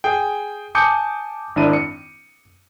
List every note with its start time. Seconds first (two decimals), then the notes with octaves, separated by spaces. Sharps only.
0.04 G#4 G5
0.75 G#5 A5 D6 D#6 G6 C#7
1.56 G#1 D#3 D4 E4 D#7
1.73 C#7